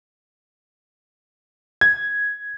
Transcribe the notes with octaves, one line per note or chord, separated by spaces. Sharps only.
G#6